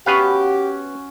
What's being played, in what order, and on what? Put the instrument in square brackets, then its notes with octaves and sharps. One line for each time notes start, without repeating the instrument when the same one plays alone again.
[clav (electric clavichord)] B3 B4 F5 [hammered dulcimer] C#4 F#4 [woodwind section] G4